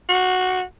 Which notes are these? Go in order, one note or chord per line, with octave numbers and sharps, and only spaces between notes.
F#4